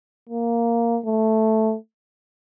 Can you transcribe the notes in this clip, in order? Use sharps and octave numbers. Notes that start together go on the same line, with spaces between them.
A#3
A3